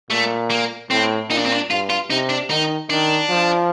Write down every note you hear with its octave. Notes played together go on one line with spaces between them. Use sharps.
A#2 A3
A#3
A2 C4
A#2 D#4
D4
C4
D4
G2 F4
F4
C3 D#4
D4
D#3 D#4
D#3 D4
F3